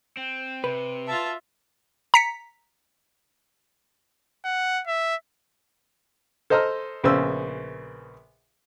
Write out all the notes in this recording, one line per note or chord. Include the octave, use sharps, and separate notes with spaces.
C4 G5
C3 B4
F4 E5 A5
A#5 B6 C#7
F#5
E5
A4 C5 D#5 A#5 F6
A#1 C#3 B3 C5 G#5 E6